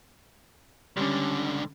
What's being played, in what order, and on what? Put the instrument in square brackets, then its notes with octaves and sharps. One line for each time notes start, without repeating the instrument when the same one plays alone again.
[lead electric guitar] C#2 D3 [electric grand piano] G3 C#4